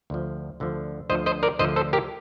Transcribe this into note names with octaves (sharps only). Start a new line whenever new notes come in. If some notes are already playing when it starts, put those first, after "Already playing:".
D2 D3 F3
D2 D3 F3
D2 D3 F3 C5 D#5
C5 D#5
A#4 D5
D2 D3 F3 C5 D#5
A4 C5
G4 A#4